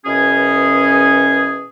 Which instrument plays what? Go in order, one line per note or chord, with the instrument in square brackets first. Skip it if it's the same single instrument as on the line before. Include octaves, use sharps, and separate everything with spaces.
[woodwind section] F#2 B2 E3 C#4 G#4